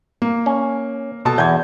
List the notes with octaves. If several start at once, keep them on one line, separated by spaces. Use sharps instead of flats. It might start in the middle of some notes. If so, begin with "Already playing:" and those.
A#3
C#4
B2 A4 A5
E2 G6 G#6